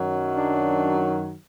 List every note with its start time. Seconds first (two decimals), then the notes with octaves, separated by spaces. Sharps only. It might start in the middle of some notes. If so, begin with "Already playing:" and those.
Already playing: F#2 D#3 F#3
0.35 D4